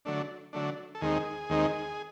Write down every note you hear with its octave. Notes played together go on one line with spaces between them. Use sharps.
D3 F#3 A3 D4
D3 F#3 A3 D4
A4
D#2 D#3 G#3 C4 D#4 G#4
D#2 D#3 G#3 C4 D#4